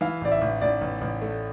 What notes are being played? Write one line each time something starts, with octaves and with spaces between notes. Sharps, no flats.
E3 F5
A1 D5
E5
A1
A1 D5
A1
A1
A3